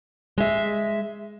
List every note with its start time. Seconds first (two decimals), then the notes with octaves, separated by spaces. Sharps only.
0.38 G#3 E5